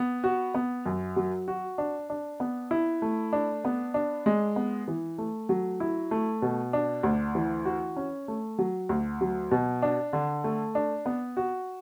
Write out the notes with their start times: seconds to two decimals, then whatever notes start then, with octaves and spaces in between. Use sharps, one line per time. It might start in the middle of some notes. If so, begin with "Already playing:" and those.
Already playing: B3
0.24 F#4
0.54 B3
0.86 F#2
1.16 F#3
1.48 F#4
1.78 D4
2.10 D4
2.40 B3
2.71 E4
3.02 A3
3.33 D4
3.65 B3
3.94 D4
4.26 G#3
4.56 B3
4.88 E3
5.18 A3
5.49 F#3
5.80 E4
6.11 A3
6.42 B2
6.73 D4
7.03 D2
7.35 E3
7.65 F#4
7.97 C#4
8.28 A3
8.59 F#3
8.89 D2
9.21 F#3
9.51 B2
9.82 D4
10.13 D3
10.44 A3
10.75 D4
11.06 B3
11.37 F#4